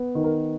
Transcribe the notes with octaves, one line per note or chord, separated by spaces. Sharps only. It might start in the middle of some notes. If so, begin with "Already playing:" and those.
Already playing: B3
D#3
A#4